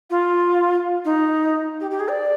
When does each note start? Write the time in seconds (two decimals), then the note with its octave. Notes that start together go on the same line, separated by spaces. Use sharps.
0.10 F4
1.05 D#4
1.80 G4
1.90 G4
1.99 G#4
2.09 D5